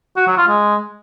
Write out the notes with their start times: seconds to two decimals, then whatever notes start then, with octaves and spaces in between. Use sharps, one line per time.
0.16 F#4
0.27 F#3
0.38 F4
0.48 G#3